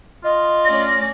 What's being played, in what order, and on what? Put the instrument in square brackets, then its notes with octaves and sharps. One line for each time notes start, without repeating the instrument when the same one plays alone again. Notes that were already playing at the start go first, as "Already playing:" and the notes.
[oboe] F4 [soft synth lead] D#5
[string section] A3 C#4 D5 [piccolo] A#6